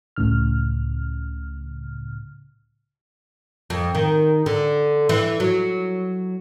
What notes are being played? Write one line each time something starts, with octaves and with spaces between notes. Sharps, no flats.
C#2 A2 C#3 F6
F2
D#3
D3
E3
F#3